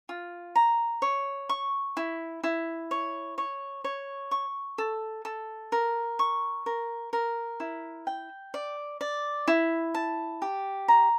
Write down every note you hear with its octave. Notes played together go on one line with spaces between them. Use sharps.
F4
A#5
C#5
C#6
E4
E4
C#5
C#5
C#5
C#6
A4
A4
A#4
C#6
A#4
A#4
E4
G5
D5
D5
E4
A5
G4
A#5